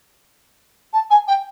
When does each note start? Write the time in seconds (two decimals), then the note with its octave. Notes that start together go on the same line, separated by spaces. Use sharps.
0.93 A5
1.10 G#5
1.28 G5